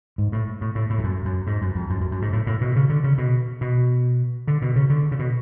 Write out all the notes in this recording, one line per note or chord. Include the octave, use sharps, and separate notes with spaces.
G#2
A2
A2
A2
A2
F2
F#2
F#2
G#2
F#2
F2
F#2
F#2
F#2
G#2
A2
A2
B2
C#3
D3
C#3
B2
B2
D3
B2
C#3
D3
C#3
B2